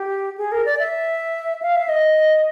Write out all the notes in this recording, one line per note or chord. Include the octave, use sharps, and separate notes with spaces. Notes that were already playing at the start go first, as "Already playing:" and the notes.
Already playing: G4
G#4
A#4
D5
E5
F5
E5
D#5